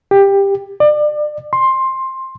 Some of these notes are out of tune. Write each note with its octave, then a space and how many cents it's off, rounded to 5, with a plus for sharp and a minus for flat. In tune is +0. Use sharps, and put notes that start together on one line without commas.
G4 +15
D5 +30
C6 +15